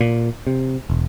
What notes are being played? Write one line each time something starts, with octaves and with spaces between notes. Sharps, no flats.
A#2
C3
E1